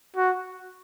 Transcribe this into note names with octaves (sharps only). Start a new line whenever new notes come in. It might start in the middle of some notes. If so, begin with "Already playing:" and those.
F#4